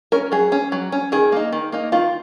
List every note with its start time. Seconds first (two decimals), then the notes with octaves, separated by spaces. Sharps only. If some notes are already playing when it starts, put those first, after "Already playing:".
0.12 C#4 A#4
0.32 F#3 G#4
0.52 C#4
0.72 F#3
0.92 C#4
1.12 D#3 G#4
1.32 A#3 D#4
1.53 D#3
1.72 A#3 D#4
1.92 D#3 F4